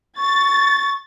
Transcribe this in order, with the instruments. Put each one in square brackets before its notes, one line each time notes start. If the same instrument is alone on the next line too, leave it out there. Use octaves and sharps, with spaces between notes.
[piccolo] C#6 [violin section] A6